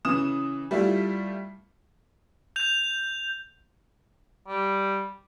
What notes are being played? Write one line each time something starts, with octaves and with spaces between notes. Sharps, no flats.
C#3 E3 D#6 E7
G3 A3 E4 F4
G6 F7
G3